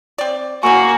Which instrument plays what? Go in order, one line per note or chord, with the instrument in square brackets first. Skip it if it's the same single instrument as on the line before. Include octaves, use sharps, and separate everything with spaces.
[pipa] C4 D5
[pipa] C#3 E3 C#6 [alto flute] A#3 [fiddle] F#4 [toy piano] G#5 E6